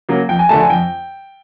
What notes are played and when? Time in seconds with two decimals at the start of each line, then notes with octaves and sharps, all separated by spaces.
0.09 C#3 F#3 A#3
0.29 F2 G5
0.39 G#5
0.49 D3 F3 A3 A5
0.60 G#5
0.70 F2 G5